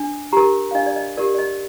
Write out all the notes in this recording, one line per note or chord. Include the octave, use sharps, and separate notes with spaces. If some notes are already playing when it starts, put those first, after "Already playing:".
Already playing: D4
G4 A#4 A#5
F5
D4 D#5
D5
D#5
G4 A#4 D5
D5
D#5